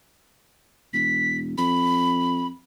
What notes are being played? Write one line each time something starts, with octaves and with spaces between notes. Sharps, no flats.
E1 B6
F2 B5